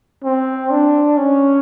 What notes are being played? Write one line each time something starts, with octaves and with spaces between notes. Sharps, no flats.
C4
D4
C#4